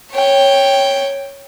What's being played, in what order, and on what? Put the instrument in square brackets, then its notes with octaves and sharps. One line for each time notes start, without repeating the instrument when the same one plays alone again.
[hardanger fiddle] C#5 G5